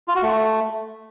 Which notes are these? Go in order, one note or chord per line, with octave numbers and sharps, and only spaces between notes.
F4
F#4
A3